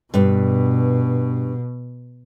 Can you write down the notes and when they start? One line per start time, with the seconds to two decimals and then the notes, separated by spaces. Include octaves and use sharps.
0.14 G2 B2 D4 B4